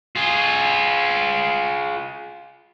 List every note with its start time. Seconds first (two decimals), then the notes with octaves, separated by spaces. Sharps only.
0.16 F4 G#4